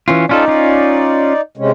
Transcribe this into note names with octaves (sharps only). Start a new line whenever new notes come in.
E3 C#4 F4
C#4 D#4 F4 A4 D5
C#4 F4
C3 G#3 C#4